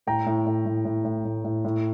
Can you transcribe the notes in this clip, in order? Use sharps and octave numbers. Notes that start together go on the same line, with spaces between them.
A2 G5 A#5
A2
A2
A2
A2
A2
A2
A2
A2